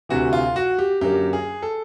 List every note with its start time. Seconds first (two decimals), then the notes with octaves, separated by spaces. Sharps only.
0.09 D2 C3 E3 F#4
0.33 F4
0.56 F#4
0.79 G4
1.01 F#2 D3 F#3 A#3 G4
1.33 G#4
1.62 A4